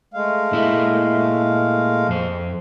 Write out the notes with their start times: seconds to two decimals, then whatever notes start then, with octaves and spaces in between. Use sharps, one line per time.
0.14 G#3 A3 F5
0.51 A#2 E4 E5
2.08 F2 C5